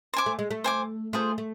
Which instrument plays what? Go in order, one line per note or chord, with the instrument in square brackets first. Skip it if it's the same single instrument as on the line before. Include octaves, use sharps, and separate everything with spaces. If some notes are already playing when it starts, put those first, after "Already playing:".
[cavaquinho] C5 G#5 D6
[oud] A3
G#3
A3
[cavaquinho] C5 G#5 D6
[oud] A3 [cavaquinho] F4 G#4 C5
[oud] A3